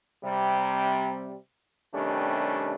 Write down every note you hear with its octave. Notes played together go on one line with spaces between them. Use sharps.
C3 G3
C3 D#3 G3 A3 C#4 D4